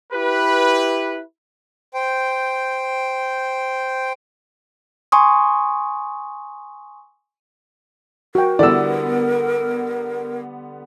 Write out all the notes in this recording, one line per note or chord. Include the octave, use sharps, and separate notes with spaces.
E4 G4 B4
C5 G5
G#5 C6 C#6 D#6
F#4 A#4 G5
D3 G3 B3 E4 A4 D5 E6